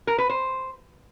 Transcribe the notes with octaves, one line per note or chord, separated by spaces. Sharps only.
A#4
B4
C5